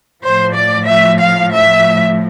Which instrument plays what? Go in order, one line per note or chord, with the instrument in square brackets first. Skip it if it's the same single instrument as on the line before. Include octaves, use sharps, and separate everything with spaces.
[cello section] A2 F3 C5
D5
E5
F5
E5